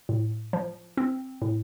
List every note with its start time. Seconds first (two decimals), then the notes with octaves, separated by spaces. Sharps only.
0.09 A2
0.53 F3
0.97 C4
1.42 A2